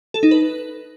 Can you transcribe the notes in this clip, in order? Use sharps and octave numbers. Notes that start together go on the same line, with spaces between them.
A4
D#4
B4